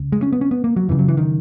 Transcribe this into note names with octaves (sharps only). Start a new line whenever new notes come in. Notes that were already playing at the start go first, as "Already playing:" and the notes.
Already playing: C#2 C#3
G#3
C#4
B3
C#4
B3
A#3
F#3
F#2 C#3 E3
F#3
E3
D#3